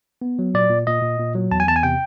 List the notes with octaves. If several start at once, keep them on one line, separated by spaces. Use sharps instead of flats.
B3
F#3
A#2 D5
A#2
A#2 D#5
A#2
A#2
F#3
E2 A5
G#5
E2 A5
G#5
C3 G5